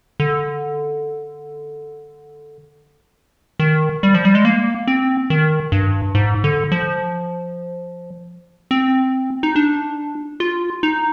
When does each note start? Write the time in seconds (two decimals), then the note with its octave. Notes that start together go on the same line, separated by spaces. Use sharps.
0.20 D3
3.60 D#3
4.03 G3
4.14 F3
4.25 G3
4.35 G#3
4.45 A#3
4.87 C4
5.30 D#3
5.72 G2
6.15 G#2
6.44 D3
6.72 F3
8.71 C4
9.43 D#4
9.56 D4
10.40 F4
10.83 D#4